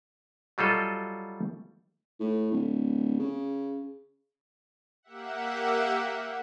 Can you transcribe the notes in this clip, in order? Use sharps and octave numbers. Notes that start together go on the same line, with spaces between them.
F#3 G3 F4 A4 D#5
A2
D1
C#3
A#3 G4 E5 F#5